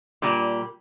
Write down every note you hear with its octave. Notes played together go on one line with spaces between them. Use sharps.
A#2 G3